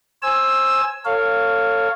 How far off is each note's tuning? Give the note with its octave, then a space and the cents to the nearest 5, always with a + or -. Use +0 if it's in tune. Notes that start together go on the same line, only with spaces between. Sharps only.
C5 +25 G#5 +0 E6 +0
A4 +40 C#5 +5 F5 +0